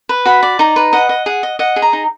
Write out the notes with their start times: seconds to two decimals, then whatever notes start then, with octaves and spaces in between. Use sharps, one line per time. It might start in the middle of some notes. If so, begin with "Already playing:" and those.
0.09 B4
0.25 F#4 B5
0.43 D5
0.59 D#4 A#5
0.76 B4
0.93 D#5 F#5
1.09 D#5
1.26 G#4 F#5
1.43 D#5
1.59 D#5 F#5
1.76 G#4
1.82 A#5
1.93 D#4